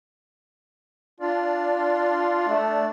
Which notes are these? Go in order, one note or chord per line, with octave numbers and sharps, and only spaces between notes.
D4 F4 D5
A3